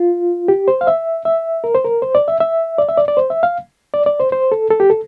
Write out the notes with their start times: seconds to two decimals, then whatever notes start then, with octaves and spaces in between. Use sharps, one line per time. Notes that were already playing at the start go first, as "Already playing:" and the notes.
Already playing: F4
0.48 G4
0.68 C5
0.81 F5
0.87 E5
1.25 E5
1.64 A#4
1.75 C5
1.85 A#4
2.02 C5
2.15 D5
2.28 E5
2.40 E5
2.78 D5
2.89 E5
2.97 D5
3.08 D5
3.17 C5
3.30 E5
3.43 F5
3.94 D5
4.06 D5
4.20 C5
4.32 C5
4.52 A4
4.71 A4
4.80 G4
4.90 A4